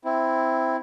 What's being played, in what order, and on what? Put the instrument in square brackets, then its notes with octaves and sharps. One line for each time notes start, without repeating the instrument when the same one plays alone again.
[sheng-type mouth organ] C4 E4